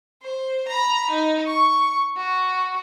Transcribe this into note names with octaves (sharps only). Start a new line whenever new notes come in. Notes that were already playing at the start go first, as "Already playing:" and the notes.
C5
A#5 B5
D#4
C#6
F#4